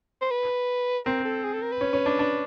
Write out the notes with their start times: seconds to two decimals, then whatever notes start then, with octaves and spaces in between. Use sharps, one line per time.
0.22 C5
0.30 B4
1.06 C4 A#4
1.25 A4
1.43 G#4
1.53 A4
1.62 A#4
1.72 B4
1.81 C#4
1.93 C#4
2.06 D4
2.19 D4